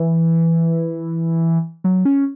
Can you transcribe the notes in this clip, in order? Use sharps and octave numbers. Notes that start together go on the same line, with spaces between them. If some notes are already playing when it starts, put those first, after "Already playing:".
Already playing: E3
F#3
C#4